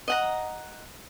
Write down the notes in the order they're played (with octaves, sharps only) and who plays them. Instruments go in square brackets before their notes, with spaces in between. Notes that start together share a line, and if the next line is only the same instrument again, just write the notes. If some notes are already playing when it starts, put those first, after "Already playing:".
[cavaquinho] D#5 F#5 A#5